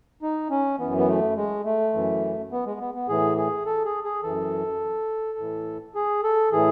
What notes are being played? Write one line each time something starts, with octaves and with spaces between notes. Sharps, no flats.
D#4
C#4
F#2 E3 B3
B3
A3
G#3
A3
F#2 E3
B3
G#3
B3
B3
A2 E3 G#4
G#4
A4
G#4
G#4
F#2 E3 A4
A2 E3
G#4
A4
A2 E3 G#4